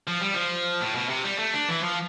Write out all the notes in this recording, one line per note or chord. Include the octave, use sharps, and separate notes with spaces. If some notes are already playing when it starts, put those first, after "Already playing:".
F3
G3
F3
A2
B2
C3
G3
A3
D4
E3
F3